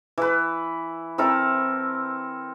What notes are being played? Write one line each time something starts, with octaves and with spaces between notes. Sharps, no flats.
E3 B4
C4 E4 A4 A#4